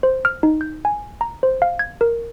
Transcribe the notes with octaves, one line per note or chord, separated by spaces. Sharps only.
C5
F6
D#4
G6
G#5
A#5
C5
F5
G#6
A#4